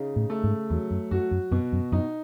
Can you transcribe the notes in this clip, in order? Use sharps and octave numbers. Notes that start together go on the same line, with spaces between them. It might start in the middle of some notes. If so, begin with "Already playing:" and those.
Already playing: C#3 D#4
A2
A3
G#2
E2 F#3
F#2
F#2 F#4
F#2
F#2 B2
F#2
F#2 D#4